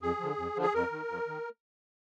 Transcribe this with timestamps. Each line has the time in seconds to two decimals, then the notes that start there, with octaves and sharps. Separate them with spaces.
0.02 F2 G#4
0.20 D3 F3
0.38 F2
0.56 D3 F3
0.62 G#4
0.74 F2 A#4
0.92 D#3
1.09 F2
1.28 D#3